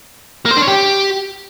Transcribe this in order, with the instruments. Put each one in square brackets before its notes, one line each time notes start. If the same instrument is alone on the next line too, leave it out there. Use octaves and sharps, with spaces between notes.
[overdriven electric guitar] A#3
C5
D4
C#5
G4